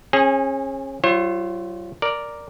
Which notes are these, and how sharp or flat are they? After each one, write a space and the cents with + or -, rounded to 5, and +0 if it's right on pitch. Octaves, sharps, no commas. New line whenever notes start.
C#4 -35 G#4 +0
F#3 +40 F4 -25 C5 +45
A#4 +0 D5 +0